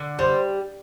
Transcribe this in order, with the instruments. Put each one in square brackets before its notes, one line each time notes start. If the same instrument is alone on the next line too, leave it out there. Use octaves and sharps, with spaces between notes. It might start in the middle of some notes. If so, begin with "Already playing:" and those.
Already playing: [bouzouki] D3
[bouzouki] G3 [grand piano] C5